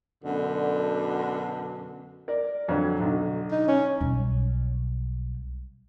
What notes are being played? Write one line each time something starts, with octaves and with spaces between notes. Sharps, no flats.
F#2 B2 D3
A#4 D5
F2 D3 F#3
B1 D3
D#4
C#4
B1 G3